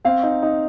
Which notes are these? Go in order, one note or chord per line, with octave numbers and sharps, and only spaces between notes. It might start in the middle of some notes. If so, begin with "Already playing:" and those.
C4 F5
D#4
D#4